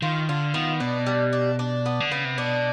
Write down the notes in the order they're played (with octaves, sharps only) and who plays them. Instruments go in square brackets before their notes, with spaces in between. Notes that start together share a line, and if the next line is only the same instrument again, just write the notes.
[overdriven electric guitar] D#3 [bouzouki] F4
[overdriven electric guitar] D3 [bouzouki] F4
[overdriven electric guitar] D#3 [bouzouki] B3
[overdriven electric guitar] B2 [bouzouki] D4
[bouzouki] G3
D4
D4
B3
[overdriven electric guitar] D3
[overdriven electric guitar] C#3 [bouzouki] B3
[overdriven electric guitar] C3
[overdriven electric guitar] B2 [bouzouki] D4